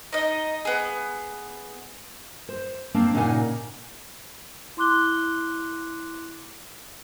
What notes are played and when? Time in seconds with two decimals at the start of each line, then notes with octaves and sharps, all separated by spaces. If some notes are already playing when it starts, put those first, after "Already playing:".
0.13 D#4 D#5
0.65 B3 G#4
2.49 C5
2.94 A#3 C4 D4
3.14 A#2 C#3 D#4 F#5 G#5
4.77 E4 C6 D6 F#6 G7